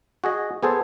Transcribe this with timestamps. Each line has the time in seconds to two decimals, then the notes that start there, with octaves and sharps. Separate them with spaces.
0.24 F#4 G#4 D#5
0.63 B3 G#4 A4 C5